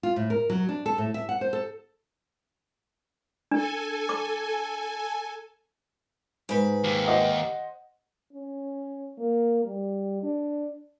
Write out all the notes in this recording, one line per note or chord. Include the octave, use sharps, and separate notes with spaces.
F4
A2
A#4
F#3
D4
A4
A2
E5
F#5
C5
A4
D4 A4 G#5
D6
G#2 B4
D#2
C5 D#5 F#5
C#4
A#3
G3
D4